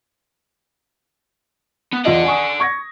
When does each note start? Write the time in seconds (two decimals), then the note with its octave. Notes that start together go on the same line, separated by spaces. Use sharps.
1.93 B3
2.05 E2 F4 D5 D#5 F#5
2.25 G#5 C#6 D#6
2.60 C#6 G#6 A#6